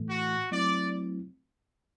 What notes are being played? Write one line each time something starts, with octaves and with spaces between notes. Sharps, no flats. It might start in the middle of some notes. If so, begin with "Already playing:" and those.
Already playing: A2 E3 A3
F#4
F#3 A3 C4 E4 D5